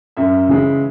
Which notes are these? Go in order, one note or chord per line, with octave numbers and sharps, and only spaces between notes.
F#2 E5
C#3 E3 G#3